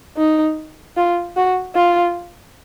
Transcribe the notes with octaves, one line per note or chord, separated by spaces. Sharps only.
D#4
F4
F#4
F4